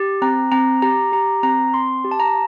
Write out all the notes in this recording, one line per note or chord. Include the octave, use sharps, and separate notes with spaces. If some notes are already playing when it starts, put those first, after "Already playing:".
Already playing: G4
C4 A#5
C4 A#5
G4 A#5
G4 A#5
C4 A#5
C4 C6
G4
A5
A#5